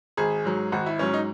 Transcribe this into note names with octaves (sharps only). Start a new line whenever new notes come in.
G#1 G#4
G#2 F#3
G#1 F#4
E4
G#2 F#3 C#4
D#4